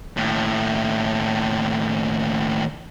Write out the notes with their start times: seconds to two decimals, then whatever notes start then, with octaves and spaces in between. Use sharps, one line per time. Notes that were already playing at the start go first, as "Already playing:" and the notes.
0.17 D#2 A2